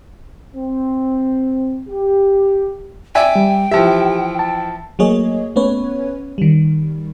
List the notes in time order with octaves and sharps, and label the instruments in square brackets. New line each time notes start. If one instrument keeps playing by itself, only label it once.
[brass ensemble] C4
G4
[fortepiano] D5 E5 G#5 [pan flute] G5
[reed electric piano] G3
[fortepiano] E3 F3 E5 [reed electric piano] G4
[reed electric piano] A5
[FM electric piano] F#3 A3 A#3 G#4 C#5 D#5
A3 B3 C#4 B4 C#5
D#3 G3